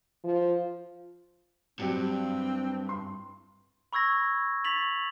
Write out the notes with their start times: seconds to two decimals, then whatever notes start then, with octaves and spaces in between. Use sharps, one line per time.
0.24 F3
1.79 G2 F#3 G3 C4
2.89 C6
3.93 B5 C#6 E6 G#6 A#6
4.65 C#6 A6 B6 F7 F#7